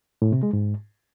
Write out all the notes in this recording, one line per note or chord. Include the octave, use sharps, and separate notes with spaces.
A2
C3
G#3
G#2